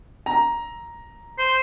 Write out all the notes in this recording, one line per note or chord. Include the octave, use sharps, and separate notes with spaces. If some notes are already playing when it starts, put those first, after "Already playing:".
A#5
C5